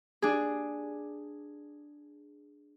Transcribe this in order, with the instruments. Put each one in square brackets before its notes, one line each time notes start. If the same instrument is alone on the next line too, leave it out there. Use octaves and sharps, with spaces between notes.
[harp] D4 G#4